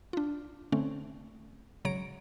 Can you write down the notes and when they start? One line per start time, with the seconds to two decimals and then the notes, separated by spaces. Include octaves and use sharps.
0.13 D4 F4
0.72 D3 A3 C4 C#4
1.85 G#1 C#3 F#3 C#5 A#5 D7